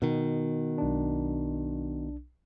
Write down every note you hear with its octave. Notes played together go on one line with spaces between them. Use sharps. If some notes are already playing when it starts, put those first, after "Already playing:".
B2 D#3
B1 D4